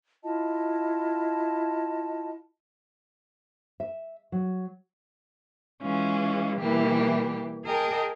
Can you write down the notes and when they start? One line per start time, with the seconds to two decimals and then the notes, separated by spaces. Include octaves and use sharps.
0.24 E4 F4 D#5 A5
3.80 E5
4.32 F#3
5.82 E3 G#3 C#4 F4
6.60 B2 E3 G3 A#3 E4 G4
7.65 G#4 A#4 D#5 G5 A5